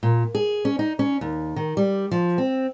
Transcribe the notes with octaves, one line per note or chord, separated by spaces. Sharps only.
A#2
G#4
C#4
D#4
C#4
D#2
D#3
G3
F3
C4